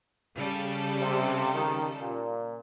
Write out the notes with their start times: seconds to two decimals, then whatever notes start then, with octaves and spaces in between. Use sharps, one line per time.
0.34 C#3 G3 A4
1.01 C3
1.54 D#3
2.01 A#2